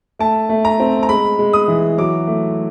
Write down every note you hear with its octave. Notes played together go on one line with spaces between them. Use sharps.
A3 A5
A3
A#5
C4
A#5
G#3 B5
G#3
D#6
E3
F#3 D6
A3